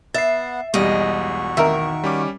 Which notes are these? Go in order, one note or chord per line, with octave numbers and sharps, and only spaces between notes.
B3 E5 F#5 A6 C7
B1 E2 G3 G#3 F#4 D#5 C#6
D#3 A#4 E5
G3 C#4 D6